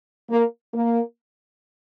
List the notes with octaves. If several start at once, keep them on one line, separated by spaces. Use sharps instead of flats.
A#3
A#3